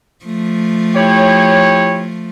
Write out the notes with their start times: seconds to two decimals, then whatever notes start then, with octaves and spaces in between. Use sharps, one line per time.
0.25 F3 A3
0.96 E4 G4 C#5